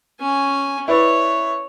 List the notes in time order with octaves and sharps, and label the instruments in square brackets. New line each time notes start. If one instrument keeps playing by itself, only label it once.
[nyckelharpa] C#4 G#5
[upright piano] E4 B4 D5 [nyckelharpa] C#5